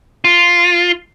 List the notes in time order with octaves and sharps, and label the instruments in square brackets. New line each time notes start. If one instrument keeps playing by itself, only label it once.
[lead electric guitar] F4